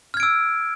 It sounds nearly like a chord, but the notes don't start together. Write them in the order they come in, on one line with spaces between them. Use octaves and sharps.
F6 G#6 D7 E6